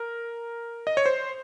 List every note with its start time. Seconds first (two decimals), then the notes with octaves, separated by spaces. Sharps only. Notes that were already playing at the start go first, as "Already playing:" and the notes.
Already playing: A#4
0.87 D#5
0.97 C#5
1.06 C5